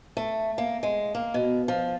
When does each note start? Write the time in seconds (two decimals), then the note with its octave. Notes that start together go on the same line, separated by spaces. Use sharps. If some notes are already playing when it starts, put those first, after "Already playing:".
0.17 A3
0.58 A#3
0.83 G#3
1.15 A#3
1.34 B2
1.68 F3